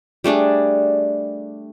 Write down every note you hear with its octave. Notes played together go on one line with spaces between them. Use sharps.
G3 A3 D4 G#4